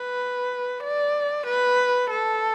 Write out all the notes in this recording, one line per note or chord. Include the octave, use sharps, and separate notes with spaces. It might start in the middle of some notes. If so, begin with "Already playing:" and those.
Already playing: B4
D5
B4
A4